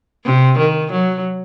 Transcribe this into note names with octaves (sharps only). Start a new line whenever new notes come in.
C3
D#3
F#3